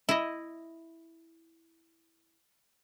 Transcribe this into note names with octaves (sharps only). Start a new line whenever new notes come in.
E4 D#5